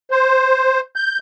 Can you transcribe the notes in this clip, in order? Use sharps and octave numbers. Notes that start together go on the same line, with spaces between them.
C5
G6